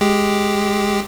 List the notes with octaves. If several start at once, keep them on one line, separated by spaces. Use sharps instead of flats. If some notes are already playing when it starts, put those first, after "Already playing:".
G#3 G4